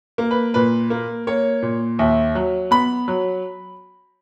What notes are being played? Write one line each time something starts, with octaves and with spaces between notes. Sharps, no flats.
A#3
B4
A#2 B4
A#3
A#3 C#5
A#2
D#2 E5
F#3
B3 B5
F#3